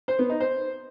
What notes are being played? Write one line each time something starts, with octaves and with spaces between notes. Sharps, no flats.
C5
B3
D#4
C5